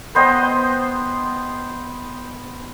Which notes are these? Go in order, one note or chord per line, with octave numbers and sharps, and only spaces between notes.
B3 C5 D#5 G5